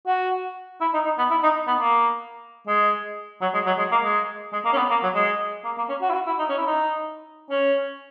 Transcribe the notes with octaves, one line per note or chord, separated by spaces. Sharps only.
F#4
E4
D#4
D#4
B3
E4
D#4
B3
A#3
G#3
F#3
G#3
F#3
G#3
A#3
G#3
G#3
A#3
C#4
B3
A#3
F#3
G#3
A#3
A#3
C#4
F#4
E4
F#4
E4
D#4
C#4
E4
D#4
C#4